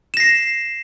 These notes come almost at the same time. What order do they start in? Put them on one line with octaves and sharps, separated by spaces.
E7 A#6 C7